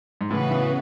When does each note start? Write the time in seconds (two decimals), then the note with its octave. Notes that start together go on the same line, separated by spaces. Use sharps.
0.21 G#2
0.31 A2 C#3 E3 B3 F#4 B4
0.51 A2